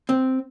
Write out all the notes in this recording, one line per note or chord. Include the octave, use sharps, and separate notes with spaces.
C4